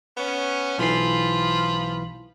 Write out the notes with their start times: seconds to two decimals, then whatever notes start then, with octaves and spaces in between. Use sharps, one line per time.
0.17 B3 C#4
0.78 B1 E3 F3 F4 B5 C7